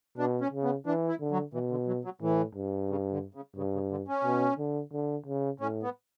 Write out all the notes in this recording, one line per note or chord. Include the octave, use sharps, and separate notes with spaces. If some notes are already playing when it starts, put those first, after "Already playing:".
B2 D4
C#4
C#3
B3
E3 D4
E4
D3
F#3
B2 E3
D3
F#3
F#3
A2 E3
G2
C#3
D3
C#3
G2 C#3
C#3
D3
C#4
B2
D3
D3
C#3
A2 C#4
B3